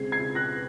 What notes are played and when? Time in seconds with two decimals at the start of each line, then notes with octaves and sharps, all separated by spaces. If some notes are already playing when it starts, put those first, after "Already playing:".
Already playing: C#3 G#3 C4 G#6 C7
0.12 G#6 C7
0.35 F#6 A#6